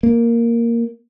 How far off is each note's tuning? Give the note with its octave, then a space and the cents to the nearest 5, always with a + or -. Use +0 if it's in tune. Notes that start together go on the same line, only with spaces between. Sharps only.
A#3 +0